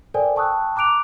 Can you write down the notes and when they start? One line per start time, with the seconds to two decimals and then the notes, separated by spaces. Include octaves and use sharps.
0.14 A4 A#4 C5 D5 G5 G#5
0.36 G5 A5 C#6 D#6 E6 F#6
0.76 A#5 D6 F#6 D7 F7